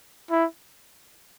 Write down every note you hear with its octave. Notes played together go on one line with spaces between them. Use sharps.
E4